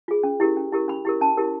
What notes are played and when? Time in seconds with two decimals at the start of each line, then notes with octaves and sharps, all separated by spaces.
0.08 F4 G#4
0.23 C#4
0.40 E4 G4 A#4
0.57 C#4
0.72 E4 G4 A#4
0.88 C#4 B5
1.05 E4 G4 A#4
1.21 C#4 A5
1.37 E4 G4 A#4